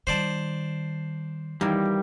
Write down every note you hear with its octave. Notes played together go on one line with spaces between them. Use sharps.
D#3 G3 C5 D5 A5
D#3 E3 G3 A#3